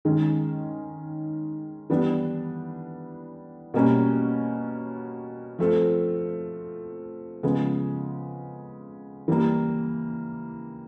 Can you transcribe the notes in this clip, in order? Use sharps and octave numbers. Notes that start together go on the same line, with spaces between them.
D#3 G#3 C#4
E3 G3 B3 D4
B2 G3 A#3 C#4
F3 A3 C4 F4
C#3 F3 G#3 B3
E3 G3 A#3